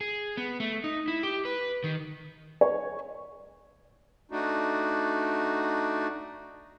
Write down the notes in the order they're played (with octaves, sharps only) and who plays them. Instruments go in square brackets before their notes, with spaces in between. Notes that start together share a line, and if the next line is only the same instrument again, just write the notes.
[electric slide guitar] G#4
B3
A3
D#4
E4
G4
B4
D#3
[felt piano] C#5
[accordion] A3 D4 D#4 F#4